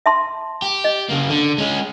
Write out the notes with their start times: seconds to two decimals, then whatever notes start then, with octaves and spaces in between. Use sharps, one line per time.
0.06 E5 A5 C6
0.62 G4
0.84 D#5
1.09 C#3 A#3
1.30 D3
1.58 G#3 C#4